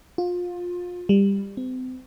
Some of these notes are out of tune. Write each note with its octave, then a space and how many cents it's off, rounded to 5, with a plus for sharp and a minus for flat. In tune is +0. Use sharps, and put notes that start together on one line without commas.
F4 +25
G3 +20
C4 -40